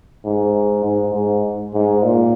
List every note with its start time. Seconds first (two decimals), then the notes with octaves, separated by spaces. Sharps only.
0.25 G#2
0.84 G#2
1.14 G#2
1.74 G#2
2.04 A#2